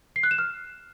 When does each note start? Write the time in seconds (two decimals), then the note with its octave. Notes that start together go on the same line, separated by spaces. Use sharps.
0.16 C7
0.23 F#6
0.31 E7
0.39 F6